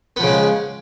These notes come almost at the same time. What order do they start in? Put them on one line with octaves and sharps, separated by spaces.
B3 F3 C#3 G#3